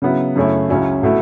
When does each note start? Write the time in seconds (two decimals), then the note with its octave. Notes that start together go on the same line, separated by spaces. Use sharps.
0.02 C#3 F#3 B3 E4
0.36 F#2 C#3 A3 C#4 E4
0.69 C#2 C#3 F#3 C#4 E4
1.03 B2 A3 E4